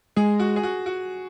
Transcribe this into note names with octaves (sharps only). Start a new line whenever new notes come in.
G#3 G#4
F#4
G#4
F#4
F#4